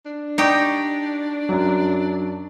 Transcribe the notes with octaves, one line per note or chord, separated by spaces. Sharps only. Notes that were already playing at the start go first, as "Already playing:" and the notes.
D4
D#4 G4 D5 G5 C#6
F#2 F#3